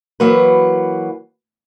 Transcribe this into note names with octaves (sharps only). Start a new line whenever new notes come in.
E3 F#3 A#3 F#4 B4